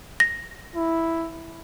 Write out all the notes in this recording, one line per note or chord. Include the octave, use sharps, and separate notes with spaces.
A#6
E4